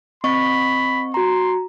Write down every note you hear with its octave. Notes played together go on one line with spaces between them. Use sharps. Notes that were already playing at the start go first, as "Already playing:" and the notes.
C4 D#5 B5 C#6
F#4 A#5 C6